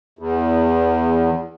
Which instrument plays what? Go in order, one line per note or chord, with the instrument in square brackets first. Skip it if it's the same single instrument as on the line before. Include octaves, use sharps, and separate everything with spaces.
[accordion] E2